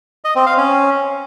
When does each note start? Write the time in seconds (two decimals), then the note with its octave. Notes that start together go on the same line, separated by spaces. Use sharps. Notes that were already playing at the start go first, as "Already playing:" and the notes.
0.24 D#5
0.35 C4
0.46 F5
0.57 C#4